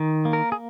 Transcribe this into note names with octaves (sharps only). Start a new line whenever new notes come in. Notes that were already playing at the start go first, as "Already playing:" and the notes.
Already playing: D#3
A#3
A#4
G#4